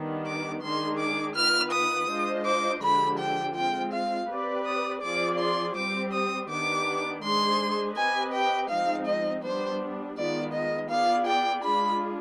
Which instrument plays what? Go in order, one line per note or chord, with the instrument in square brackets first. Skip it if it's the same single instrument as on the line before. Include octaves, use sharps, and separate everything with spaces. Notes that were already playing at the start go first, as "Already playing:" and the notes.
Already playing: [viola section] D#3 G3 B3 D4
[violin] D6
[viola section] D#3 G#3 D4 G#4 [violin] C6
[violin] D6
[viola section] D#3 B3 F4 B4 [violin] F6
[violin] D#6
[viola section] G#3 D4 F4 C5 D#5
[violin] D6
[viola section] D3 F3 G#3 D4 G4 [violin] B5
[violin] G5
[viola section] G#3 C4 F4 [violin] G5
[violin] F5
[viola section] C4 G4 B4 D5
[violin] D#6
[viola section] F3 C4 F4 G#4 D5 [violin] D6
[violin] C6
[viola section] G3 C4 G4 C5 [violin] D6
[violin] D#6
[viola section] D#3 B3 D4 G4 [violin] D6
[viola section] G#3 D4 G#4 C5 [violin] C6
[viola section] C4 G4 B4 D#5 [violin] G#5
[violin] G5
[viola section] F3 G#3 C4 D#4 [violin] F5
[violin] D#5
[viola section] G3 B3 D4 [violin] C5
[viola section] D#3 G#3 B3 F4 [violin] D5
[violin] D#5
[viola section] B3 F4 G#4 D5 [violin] F5
[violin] G5
[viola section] G#3 D4 F4 G#4 [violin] B5